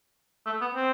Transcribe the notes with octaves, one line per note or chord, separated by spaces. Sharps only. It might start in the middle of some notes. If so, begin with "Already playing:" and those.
A3
B3
C4